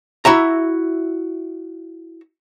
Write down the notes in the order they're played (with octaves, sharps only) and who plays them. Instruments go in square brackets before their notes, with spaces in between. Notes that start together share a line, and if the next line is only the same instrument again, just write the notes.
[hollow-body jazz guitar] E4 F#4 E5 A#5